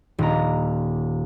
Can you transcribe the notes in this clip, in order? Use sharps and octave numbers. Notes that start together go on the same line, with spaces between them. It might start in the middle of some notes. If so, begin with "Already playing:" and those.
D#1 A#5